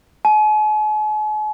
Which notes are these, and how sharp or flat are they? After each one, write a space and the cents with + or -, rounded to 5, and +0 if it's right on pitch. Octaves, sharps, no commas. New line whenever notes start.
G#5 +45